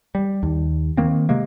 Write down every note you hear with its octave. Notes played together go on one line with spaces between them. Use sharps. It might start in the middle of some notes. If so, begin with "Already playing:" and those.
G3
D#2
D#3 A#3 C4
C3 G#3 A#3